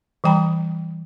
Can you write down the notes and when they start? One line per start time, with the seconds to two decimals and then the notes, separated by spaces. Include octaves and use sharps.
0.24 E3 G3 G5 A#5 B5